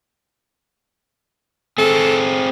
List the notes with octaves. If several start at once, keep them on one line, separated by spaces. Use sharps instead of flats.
C4 G#4 A4